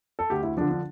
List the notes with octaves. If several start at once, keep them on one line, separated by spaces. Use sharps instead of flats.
A4
D2 G4
E4
D3 F3 D4
D4